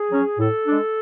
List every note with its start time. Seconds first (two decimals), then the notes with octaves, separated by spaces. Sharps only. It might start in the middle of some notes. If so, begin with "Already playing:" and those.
Already playing: G#4
0.11 F#3 C#4
0.38 A2 A4
0.66 G#3 D4